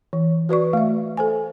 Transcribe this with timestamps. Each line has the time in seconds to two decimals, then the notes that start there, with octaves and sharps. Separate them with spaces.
0.13 E3
0.49 F#4 B4 D5 C#6
0.73 A3 E5
1.17 A4 C5 G#5